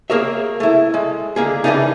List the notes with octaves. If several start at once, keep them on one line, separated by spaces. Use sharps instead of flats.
A#3 G#4 A#4 C#5 E5
A3 E4
G#3
D3 A#3 G#4
E3 F#3 G3 A#3 D4 D#4